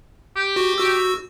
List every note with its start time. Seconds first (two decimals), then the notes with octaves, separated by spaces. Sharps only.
0.36 G4
0.56 F#4
0.78 F#4 E6